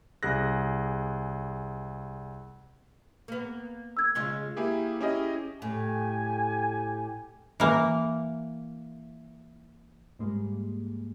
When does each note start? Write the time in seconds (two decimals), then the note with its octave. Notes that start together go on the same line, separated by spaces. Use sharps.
0.23 C2 G#4 F#6 A#6
3.28 A#3 B3
3.97 E6 G#6
4.15 C#3 G#3 F4
4.57 A#3 E4 G4 G#4
5.01 C#4 E4 G4 G#4 D#5
5.62 A2 G4 G#5
7.60 E3 A#3
10.19 G#2 G3 G#3 A#3